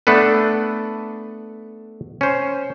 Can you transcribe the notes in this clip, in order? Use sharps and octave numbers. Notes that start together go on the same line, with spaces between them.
A3 B3 D4 A4 B4
C#4 C5